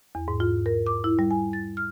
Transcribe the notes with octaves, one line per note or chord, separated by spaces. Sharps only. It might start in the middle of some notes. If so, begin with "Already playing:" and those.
E2
G#2
F4
A#4
D6
E4
G3
G#5
A6
F6